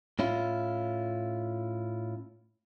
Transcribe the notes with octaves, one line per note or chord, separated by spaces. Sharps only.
A2 C#4 E4 F4